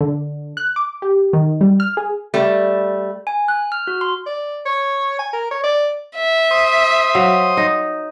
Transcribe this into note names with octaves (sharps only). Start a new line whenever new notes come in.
D3
F#6
D6
G4
D#3
G3
F6
G#4
G3 A3
G#5
F#6
F6
F#4
C6
D5
C#5
G#5
A#4
C#5
D5
E5
C5 D#6
F#3 F5
D#4